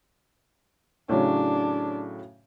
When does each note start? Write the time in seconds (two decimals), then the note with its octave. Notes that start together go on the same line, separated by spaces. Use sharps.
1.09 A2 C#3 F#3 D4